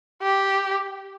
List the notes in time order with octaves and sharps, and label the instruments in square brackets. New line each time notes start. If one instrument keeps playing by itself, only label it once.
[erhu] G4